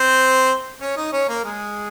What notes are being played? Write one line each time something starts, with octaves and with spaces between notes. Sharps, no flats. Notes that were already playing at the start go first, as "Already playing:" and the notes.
Already playing: C4 C5
C#4 C#5
D#4 D#5
C#4 C#5
A#3 A#4
G#3 G#4